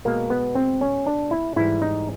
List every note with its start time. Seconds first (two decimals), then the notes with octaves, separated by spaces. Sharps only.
0.05 B2 G#3 A#3
0.30 B3
0.55 C4
0.81 C#4
1.06 D4
1.31 E4
1.56 G#2 E3 G3 E4
1.82 D#4